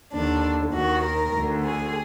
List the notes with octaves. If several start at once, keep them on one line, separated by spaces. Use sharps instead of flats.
D#2 D3 D4
D#2 D#3 F#4
A#4
D2 D3
G#4